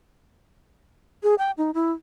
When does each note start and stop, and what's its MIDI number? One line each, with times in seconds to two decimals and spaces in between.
1.23 1.35 68
1.38 1.51 79
1.58 1.71 63
1.74 1.92 64